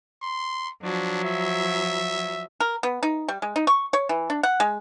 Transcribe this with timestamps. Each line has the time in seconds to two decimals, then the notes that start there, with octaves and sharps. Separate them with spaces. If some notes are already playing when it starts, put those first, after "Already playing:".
0.22 C6
0.83 F3 F#3 D4
1.24 E5
2.60 A#4
2.83 B3
3.03 D#4
3.28 G3
3.42 G#3
3.56 D#4
3.67 C#6
3.93 C#5
4.09 E3
4.30 D4
4.43 F#5
4.60 G#3